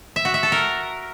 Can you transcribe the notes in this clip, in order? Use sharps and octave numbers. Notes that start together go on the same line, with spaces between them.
E5
F#4
E5
A4
A#4